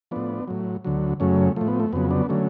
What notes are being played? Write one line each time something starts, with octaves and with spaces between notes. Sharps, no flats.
A2 F3 B3 D4
A2 F#3
D2 D3 F#3
F#2 C#3 F#3 A3 C#4
A2 F3 A3
B3
A3
F2 C#3 F#3 B3
B3 D4
D3 F#3 A3 C#4